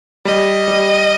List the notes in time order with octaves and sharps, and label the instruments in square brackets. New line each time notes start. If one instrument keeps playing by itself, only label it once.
[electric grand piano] G3 [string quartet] D#5
[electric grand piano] G3